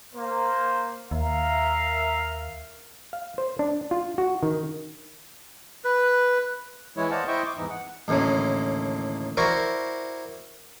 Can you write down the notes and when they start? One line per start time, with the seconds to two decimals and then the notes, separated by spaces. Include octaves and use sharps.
0.15 A#3 C5
1.11 D#2 A#4 E5 F5
3.13 F5
3.38 C5
3.59 D4
3.91 F4
4.18 F#4
4.43 D#3
5.84 B4
6.97 E3 G#3 E4 C#5
7.11 C5 D5 D#5 F5 F#5 A5
7.28 E4 C5 D#5 E5 G5 C#6
7.45 D6
7.58 E2 G#2 E3 D#4
7.70 F#5
8.08 A1 D#2 A2 D3 F#3
9.37 E4 F#4 A#4 C5 D5 C#6